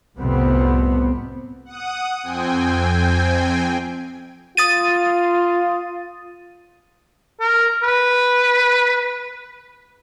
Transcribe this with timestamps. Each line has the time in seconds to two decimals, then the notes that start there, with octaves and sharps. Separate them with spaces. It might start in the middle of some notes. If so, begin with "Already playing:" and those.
0.18 C2 F2 A2 C3 B3 C4
1.65 F#5 D#6
2.23 F2 C4 G5 G#5
4.57 F4 D#6 A6 D#7
7.40 A#4
7.82 B4